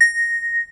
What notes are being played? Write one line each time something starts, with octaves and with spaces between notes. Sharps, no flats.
A#6